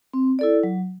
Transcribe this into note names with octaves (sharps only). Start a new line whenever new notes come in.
C4
E4 A4 D5
F#3